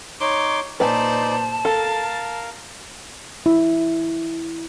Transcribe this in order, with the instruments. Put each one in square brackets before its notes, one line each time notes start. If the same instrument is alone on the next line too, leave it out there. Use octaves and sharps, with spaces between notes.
[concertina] D#4 C6 D6 [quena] C#5
[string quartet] A#2 C5 [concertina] D#4 D5 [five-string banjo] B4 G#5 [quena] A5
[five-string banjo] A4 [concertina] A#4 F5 [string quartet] A6
[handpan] E4